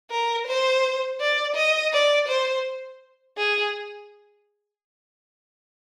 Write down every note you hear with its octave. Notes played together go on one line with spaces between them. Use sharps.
A#4
C5
D5
D#5
D5
C5
G#4